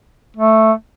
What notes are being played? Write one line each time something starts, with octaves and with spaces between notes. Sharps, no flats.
A3